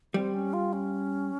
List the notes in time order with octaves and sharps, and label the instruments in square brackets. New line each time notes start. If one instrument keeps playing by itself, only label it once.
[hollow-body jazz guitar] G3 [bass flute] C4
[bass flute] C#4
F4
C#4